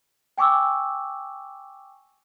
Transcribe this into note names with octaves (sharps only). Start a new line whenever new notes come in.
G5 G#5 C#6 D6 E6